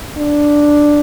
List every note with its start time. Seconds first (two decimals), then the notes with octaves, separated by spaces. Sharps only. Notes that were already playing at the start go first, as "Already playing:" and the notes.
0.18 D4